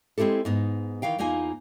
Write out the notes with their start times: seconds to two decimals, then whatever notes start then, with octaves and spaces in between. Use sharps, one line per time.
0.18 G#3 C4 E4 G4 A4
0.45 G#2 B3 D#4
1.02 D#3 E3 F5 G5
1.19 E2 A#3 D#4 F4 G#5